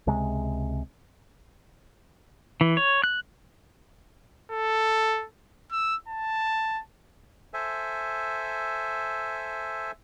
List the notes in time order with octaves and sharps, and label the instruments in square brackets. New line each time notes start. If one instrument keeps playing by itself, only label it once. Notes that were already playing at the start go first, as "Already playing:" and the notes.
[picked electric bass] C#2 C3 G#3
[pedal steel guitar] E3
C#5
F#6
[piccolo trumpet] A4
E6
A5
[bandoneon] A4 C5 E5 G#5